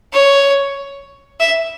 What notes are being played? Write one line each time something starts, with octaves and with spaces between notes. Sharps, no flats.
C#5
E5